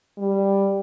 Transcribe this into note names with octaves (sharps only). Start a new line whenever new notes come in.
G3